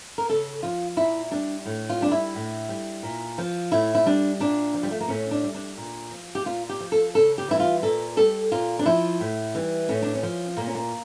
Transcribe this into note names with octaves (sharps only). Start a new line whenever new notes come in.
A#4
C#3 A4
F3 F4
A#2 E4
G3 D4
A2
F4
G3 D4
E4
A2
G3
A#2
F3
A2 E4
E4
G3 D4
A#2 D4
F3
G3
A3
A#3
A2 C#4
D4
G3
D4
A#2
F3
G4
A#2 F4
G4
F3
A4
C#3 A4
G4
E3 G3 E4
F4
A#2 A4
G3 A4
A#2 F4
D4
F3 E4
A2
E3 G3
A2 C#4
D4
C#4
F3
A#2 A#3
C#4
A#3